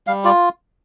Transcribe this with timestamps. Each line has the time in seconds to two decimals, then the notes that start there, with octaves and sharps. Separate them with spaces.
0.07 G3 F5
0.24 F4 D5